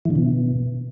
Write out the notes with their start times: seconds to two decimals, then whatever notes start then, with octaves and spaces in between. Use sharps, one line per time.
0.05 E3
0.10 D3
0.16 B2